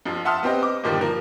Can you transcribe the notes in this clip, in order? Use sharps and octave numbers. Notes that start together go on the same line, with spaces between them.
F2 F3
E5 F#5 A5 C6 D#6 F6
B3 C4 G4 C5 D#5
D#5 D6
G2 A#2 D3 D#3 F3 G3
F3 A#4